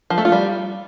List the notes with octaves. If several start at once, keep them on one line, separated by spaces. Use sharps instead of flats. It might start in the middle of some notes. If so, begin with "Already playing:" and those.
F3
A3
F4
G3